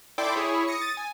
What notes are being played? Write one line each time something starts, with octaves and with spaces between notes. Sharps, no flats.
E4 A4 D5 G5 C6 D6
E4 G#4 C#5
D#6 A#6 C#7
D#6 A6 D#7
G#5